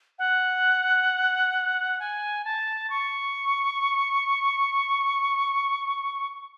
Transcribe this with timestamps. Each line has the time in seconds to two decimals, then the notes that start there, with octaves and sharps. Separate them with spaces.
0.19 F#5
2.00 G#5
2.45 A5
2.90 C#6